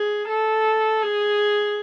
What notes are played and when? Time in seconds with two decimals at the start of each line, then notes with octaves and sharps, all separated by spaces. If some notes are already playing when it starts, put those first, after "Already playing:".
Already playing: G#4
0.29 A4
1.02 G#4